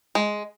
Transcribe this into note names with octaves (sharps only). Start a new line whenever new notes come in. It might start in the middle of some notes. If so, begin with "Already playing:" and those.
G#3